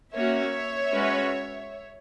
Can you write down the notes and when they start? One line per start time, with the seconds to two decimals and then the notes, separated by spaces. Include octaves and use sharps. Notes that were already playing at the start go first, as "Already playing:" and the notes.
0.14 A#3 C#4 F#4 C#5 E5
0.93 G#3 C#4 F#4 B4